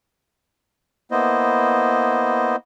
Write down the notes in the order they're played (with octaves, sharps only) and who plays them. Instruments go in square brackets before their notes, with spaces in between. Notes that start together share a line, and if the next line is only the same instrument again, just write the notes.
[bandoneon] A#3 B3 E4 C5 D#5